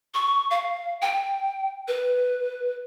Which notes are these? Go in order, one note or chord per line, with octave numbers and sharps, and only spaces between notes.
C#6
F5
G5
B4